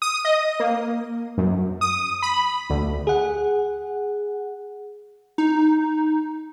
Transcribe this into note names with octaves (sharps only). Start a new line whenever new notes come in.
D#6
D#5
A#3
F#2
D#6
B5
D2
G#4 F#5
D#4